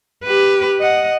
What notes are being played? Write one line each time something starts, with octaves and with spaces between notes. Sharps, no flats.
G4 B4
D#5 F#5